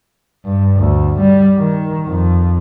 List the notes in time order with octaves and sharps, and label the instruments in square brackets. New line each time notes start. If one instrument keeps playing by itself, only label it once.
[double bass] G2
D2
G3
D#3
F2